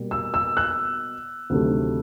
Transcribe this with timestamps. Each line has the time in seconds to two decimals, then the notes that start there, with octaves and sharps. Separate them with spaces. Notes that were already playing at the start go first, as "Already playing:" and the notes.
Already playing: B2 G3 A#3
0.11 E6
0.34 E6
0.57 F#6
1.50 D2 C3 D#3 F#3 A3